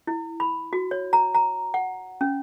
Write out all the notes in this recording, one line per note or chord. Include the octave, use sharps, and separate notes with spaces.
E4
B5
F#4
C#5
A#5
A#5
F#5
C#4